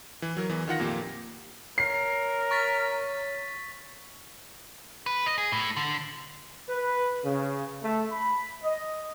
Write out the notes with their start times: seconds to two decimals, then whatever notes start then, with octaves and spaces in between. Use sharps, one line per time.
0.22 E3
0.37 F#3 A#4
0.49 E2 E3
0.68 D#3 F4 F#5 A#6
0.80 F2 A#2 A#3 G4
1.78 A#4 C#5 C7
2.51 C#6 A6 B6
5.06 B4
5.26 D#5
5.38 G#4
5.52 A2
5.77 D3
6.69 B4
7.24 C#3
7.82 A3
8.12 B5
8.63 D#5